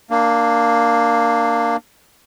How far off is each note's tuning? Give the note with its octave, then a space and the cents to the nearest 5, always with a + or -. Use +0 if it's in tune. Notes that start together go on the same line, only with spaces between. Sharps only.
A#3 +0 D4 +20